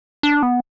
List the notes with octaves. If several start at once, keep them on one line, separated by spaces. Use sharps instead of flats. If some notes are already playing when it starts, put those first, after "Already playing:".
D4
B3